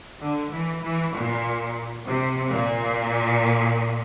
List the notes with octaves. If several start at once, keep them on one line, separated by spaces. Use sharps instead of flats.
D3
E3
E3
A#2
C3
A#2